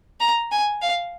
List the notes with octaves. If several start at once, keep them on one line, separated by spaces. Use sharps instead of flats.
A#5
G#5
F5